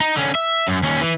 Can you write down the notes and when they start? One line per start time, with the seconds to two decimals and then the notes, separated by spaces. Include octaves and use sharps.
0.01 D#4
0.17 D3 C#4
0.35 E5
0.68 F#2
0.83 D#2 C#4
1.01 E3